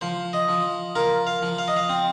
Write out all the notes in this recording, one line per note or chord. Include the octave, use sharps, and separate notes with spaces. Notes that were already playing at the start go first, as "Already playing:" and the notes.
F3 C5
D#5
F3
F4 A#4
F5
F3
F5
D#5
F5
C4